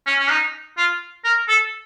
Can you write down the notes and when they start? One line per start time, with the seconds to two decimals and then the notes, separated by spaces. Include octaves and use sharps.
0.06 C#4
0.19 C#4
0.30 D#4
0.77 F4
1.25 A#4
1.48 A4